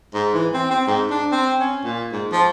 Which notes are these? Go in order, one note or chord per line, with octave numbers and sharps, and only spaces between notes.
G#2
E3
C4
C4
G#2
D4
C4
C#4
A#2
G#2
F3